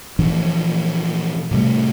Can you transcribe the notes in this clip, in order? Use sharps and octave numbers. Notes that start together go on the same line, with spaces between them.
A#2 E3 F3 D4
A2 C3 G3 A3